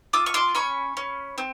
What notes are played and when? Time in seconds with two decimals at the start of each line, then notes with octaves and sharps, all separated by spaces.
0.13 F4 D6 E6
0.26 C#6
0.34 C6 D6
0.55 C#4 B5 C#6
0.97 C#4
1.38 C4